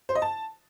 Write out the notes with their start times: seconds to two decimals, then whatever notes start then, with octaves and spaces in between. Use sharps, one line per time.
0.09 C5
0.15 D#5
0.22 A5